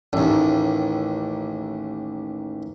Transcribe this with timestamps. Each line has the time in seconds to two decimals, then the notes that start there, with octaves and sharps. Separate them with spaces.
0.13 A1 D#2